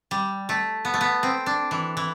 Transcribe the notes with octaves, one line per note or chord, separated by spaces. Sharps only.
G3
A3
B3
A3
B3
C4
D4
E3
E3